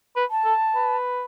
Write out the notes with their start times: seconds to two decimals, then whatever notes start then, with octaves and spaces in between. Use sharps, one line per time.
0.16 B4
0.30 A5
0.45 A4
0.75 B4